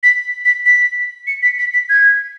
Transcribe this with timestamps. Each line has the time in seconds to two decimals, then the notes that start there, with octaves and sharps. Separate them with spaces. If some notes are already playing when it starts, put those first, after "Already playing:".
0.03 B6
0.45 B6
0.66 B6
1.27 C#7
1.43 B6
1.58 B6
1.74 B6
1.89 G#6